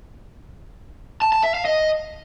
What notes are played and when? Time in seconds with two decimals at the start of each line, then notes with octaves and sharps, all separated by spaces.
1.22 A5
1.33 A5
1.43 E5
1.54 F5
1.65 D#5